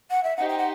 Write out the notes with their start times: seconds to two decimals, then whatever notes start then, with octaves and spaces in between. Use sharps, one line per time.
0.11 F#5
0.24 E5
0.37 D#4 G4 C5 F#5
0.49 G5
0.58 F#5